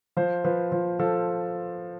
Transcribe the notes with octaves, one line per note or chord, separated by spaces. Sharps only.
F3 C5
F3 B4
F3
F3 A4